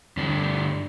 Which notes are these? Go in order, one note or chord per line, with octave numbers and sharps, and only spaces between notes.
G2 D3 A3 D4